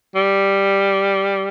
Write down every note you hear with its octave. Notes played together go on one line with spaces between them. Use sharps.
G3